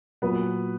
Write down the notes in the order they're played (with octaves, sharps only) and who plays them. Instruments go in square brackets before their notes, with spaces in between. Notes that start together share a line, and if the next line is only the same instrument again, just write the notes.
[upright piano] A#2 F#3 B3 B4